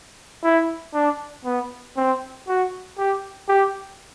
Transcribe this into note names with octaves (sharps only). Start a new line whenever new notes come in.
E4
D4
B3
C4
F#4
G4
G4